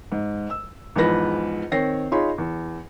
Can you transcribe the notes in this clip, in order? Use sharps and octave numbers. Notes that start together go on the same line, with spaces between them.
G#2
E6
E2 G#2 F3 B4 A#6
D#3 C4 C#5 G5 A#6 C7
D#4 F4 G#4 C#5 B5 C6
E2